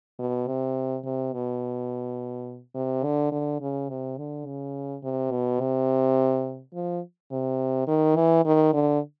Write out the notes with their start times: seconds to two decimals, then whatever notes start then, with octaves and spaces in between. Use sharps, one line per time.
0.19 B2
0.47 C3
1.04 C3
1.33 B2
2.75 C3
3.04 D3
3.32 D3
3.61 C#3
3.89 C3
4.18 D3
4.46 C#3
5.03 C3
5.31 B2
5.60 C3
6.74 F3
7.31 C3
7.88 D#3
8.16 E3
8.45 D#3
8.73 D3